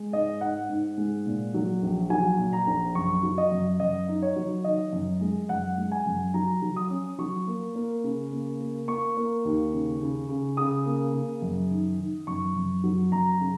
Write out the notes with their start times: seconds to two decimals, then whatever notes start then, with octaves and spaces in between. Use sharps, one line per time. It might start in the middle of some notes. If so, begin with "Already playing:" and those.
Already playing: G#3
0.13 G#2 D#5
0.41 G#2 F#5
0.69 G#2
0.98 G#3
1.26 A#2
1.54 F#3
1.83 A#1
2.10 F#3 G#5
2.39 A#2
2.53 A#5
2.67 A#1
2.95 F#2 C#6
3.23 F#3
3.38 D#5
3.52 F#2
3.80 F#2 D#5
4.08 D#4
4.22 C#5
4.36 F#3
4.64 D#3 D#5
4.93 F#2
5.21 G#3
5.49 F#2 F#5
5.78 G#3
5.92 G#5
6.06 F#2
6.34 F#3 A#5
6.62 F#3
6.76 D#6
6.90 C#4
7.19 F#3 C#6
7.47 A#3
7.75 A#3
8.04 C#3
8.32 A#3
8.60 A#3
8.88 A#3 C#6
9.17 A#3
9.45 D#2
9.73 C#3
10.01 C#3
10.29 C#3
10.57 C#3 D#6
10.86 A#3
11.14 C#3
11.42 F#2
11.70 D#3
11.99 D#3
12.27 F#2 C#6
12.56 F#2
12.84 F#3
13.12 F#2 A#5
13.41 C#3